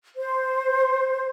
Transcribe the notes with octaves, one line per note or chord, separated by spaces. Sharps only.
C5